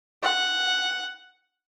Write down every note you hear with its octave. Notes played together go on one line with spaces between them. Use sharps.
F#5